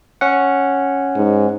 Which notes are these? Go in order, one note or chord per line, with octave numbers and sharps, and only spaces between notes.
C#4 F#5
G#2